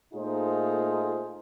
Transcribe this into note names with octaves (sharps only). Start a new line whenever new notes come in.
A#2 A3 D#4 F4 G#4 C5